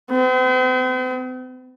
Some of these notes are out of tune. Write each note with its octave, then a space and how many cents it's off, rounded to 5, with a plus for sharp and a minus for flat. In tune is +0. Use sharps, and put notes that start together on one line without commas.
C4 -45